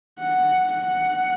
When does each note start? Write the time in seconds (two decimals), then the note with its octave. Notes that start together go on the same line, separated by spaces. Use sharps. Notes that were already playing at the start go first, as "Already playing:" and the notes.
0.19 F#5
0.74 F#5